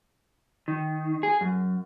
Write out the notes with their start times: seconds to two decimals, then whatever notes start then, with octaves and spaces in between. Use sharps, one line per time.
0.68 D#3
1.23 G#4
1.41 F#2